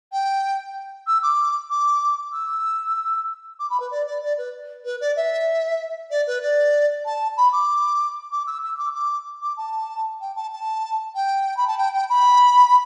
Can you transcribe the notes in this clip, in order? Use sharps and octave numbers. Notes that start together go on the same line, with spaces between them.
G5
E6
D6
D6
E6
D6
B5
B4
D5
D5
D5
B4
B4
D5
E5
D5
B4
D5
A5
B5
D6
D6
E6
E6
D6
D6
D6
A5
G5
A5
A5
G5
B5
A5
G5
G5
B5